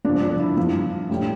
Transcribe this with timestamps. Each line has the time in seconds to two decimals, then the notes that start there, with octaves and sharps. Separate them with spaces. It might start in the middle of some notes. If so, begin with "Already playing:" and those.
0.05 G2 F3 D4
0.22 D4
0.40 E4
0.57 G2 F3 F4
1.09 A2 G3